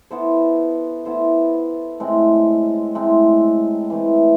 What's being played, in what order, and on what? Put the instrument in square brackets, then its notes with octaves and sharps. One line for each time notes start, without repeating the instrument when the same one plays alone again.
[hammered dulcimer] B3 E4 A4 C5
B3 E4 A4 C5
A2 G#3 C4
A2 G#3 C4
E3 A3 C4